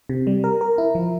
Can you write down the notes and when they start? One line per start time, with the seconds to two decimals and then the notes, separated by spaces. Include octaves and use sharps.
0.09 C3
0.27 G3
0.44 A#4
0.61 A#4
0.78 E4
0.95 F3